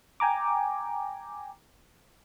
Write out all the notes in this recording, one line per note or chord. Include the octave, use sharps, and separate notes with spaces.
G5 G#5 A#5 D6